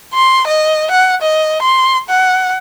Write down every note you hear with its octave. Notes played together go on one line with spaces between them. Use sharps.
C6
D#5
F#5
D#5
C6
F#5